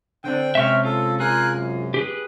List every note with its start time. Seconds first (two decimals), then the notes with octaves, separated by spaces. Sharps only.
0.24 D3 C4 D4 G5
0.55 C3 G#3 C#4 E5 C#6 F6
0.85 F4 A4
1.20 F4 G#4 A#4 G#5 F#6
1.53 F#2
1.94 G4 G#4 B4